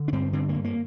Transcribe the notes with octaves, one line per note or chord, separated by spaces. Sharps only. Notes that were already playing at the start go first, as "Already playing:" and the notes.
Already playing: D3
D4
G2 C4
D3 C4
A#3
G2
A#3